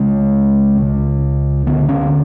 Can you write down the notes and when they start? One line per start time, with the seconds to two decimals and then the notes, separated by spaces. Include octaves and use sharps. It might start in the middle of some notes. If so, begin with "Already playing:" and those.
Already playing: C#2 C#3 G#3
0.78 C#2 C#3
1.66 D2 D3 B3
1.89 C#4